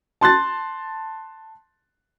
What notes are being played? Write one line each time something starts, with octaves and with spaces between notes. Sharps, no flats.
A5 C6 F#6 A6